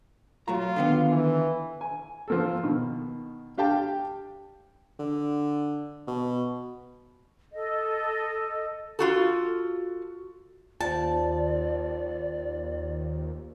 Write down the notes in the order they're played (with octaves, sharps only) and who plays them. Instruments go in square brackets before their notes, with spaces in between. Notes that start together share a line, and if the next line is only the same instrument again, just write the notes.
[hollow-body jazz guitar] F#3 A3 A#5 [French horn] F4
[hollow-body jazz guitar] D3 D#3 B3
[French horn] E3
[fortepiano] G#5
F3 A#3 A4
B2 D#3
D4 G4 F5 G5 A5
[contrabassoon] D3
B2
[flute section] A4 D#5
[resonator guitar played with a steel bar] F4 F#4 A4
[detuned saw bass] D#2 [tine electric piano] F4 C5 [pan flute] D5 [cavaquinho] A5